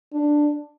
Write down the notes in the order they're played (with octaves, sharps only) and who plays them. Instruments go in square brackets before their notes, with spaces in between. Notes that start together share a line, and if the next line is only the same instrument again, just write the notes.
[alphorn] D4